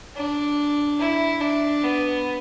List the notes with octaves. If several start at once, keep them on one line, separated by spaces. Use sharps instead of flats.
D4
E4
D4
B3